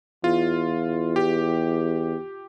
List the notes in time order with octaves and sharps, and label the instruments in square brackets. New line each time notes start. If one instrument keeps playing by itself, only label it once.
[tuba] E2 [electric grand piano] F4
[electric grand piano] G4